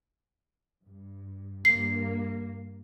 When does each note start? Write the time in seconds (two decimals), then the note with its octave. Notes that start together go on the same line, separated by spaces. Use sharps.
0.86 G2
1.65 G2 A#3 C7